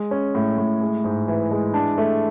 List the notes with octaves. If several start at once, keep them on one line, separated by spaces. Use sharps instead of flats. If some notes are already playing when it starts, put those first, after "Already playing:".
Already playing: G#3
C#4
A2
A2
G#3
G#2
E3
G#3
D4
A3